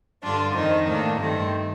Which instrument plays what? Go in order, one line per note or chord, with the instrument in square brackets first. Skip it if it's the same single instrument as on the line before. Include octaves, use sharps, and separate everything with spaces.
[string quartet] G2 D3 D4 F4
F2 D#3 C4 D#4
A2 A#3 D4
G2 D#3 A3 C4